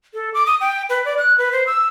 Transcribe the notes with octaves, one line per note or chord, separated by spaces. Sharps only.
A4
D6
D#6
G5
B4
D5
F#6
B4
C5
E6